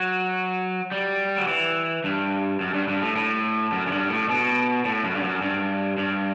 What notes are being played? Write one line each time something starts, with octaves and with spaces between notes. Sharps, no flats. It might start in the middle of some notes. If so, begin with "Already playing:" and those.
Already playing: F#3
G3
F#3
E3
G2
F#2
G2
G2
A2
A2
F#2
F#2
G2
A2
B2
A2
F#2
G2
F#2
G2
G2